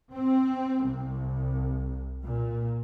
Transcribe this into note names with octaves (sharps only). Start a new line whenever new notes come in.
C4
C2
A#2